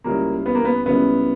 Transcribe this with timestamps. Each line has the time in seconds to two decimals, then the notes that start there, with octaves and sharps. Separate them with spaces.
0.04 C#2 C#3 G3 A#3 C#4 E4
0.46 B3
0.55 A#3
0.65 B3
0.85 C#2 C#3 G3 B3 C#4 E4